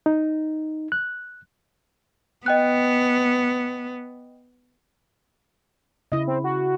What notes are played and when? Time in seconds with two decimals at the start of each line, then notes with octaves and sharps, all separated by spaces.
0.06 D#4
0.92 F#6
2.46 B3 D#5 G5 F#6
6.12 C#3 E4 D#5
6.27 C4
6.44 F#4